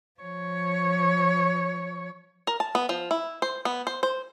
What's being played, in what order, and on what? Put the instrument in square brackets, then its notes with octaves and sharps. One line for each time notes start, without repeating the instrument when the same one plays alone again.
[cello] F3 C#5
[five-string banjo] A#4
A5
B3
F3
E4
C5
B3
C5
C5